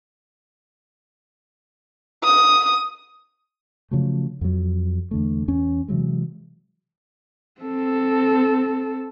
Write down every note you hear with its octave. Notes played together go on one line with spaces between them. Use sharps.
D#6
C#3 F3 F#3 A3
F2 F#3
E2 D3 A3
E2 C#4
C3 E3 F#3 G#3
C4 A4